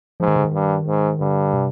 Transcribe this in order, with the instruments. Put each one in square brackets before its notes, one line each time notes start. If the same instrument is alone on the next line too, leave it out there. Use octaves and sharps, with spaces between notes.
[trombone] G#2 [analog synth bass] F3
[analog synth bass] D#3
D3
D#3
[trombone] G2
G#2
[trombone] G2 [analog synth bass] D3
[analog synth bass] C3